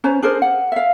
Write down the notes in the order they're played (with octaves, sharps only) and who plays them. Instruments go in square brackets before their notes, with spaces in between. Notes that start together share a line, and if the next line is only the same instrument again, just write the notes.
[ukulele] C#4 B4 C5 A#5
D4 G#4 A#4 C5
F#5
E5 F5